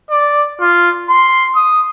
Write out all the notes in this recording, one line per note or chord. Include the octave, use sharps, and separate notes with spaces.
D5
F4
C6
D#6